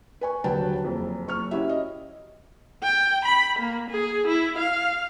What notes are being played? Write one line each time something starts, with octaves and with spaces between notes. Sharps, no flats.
B4 G#5 C#6
D#1 D3 F#3 B4 G5 A5
F#1 F2
F#1 C#6 F6
C#4 E4 F#4 G4 E5
D#5
G5
B5
A#3
G#4
E4
F5